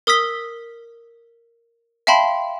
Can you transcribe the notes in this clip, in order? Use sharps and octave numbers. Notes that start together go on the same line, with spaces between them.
A#4 D#6 E6 B6 G7
E5 F5 G5 A5 B5 C6